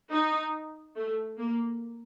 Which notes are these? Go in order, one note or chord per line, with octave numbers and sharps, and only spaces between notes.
D#4
A3
A#3